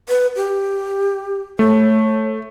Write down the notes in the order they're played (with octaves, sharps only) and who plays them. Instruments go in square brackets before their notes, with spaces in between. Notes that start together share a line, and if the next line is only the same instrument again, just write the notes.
[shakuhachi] B4
G4
[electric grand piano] A3 [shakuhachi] C#5